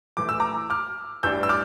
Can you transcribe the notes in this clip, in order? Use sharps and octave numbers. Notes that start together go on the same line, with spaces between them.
A#1 A2 E3 A3 D6
E6
A#5 D6
D6 F6
A1 G2 E3 G3 D4 E6 G6
E6
D6 F6